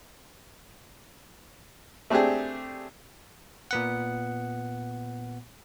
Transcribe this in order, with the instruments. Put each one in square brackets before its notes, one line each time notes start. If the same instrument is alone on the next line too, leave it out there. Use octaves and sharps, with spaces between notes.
[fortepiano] A3 C4 D4 G4 G#4
[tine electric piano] A#2 B3 F#5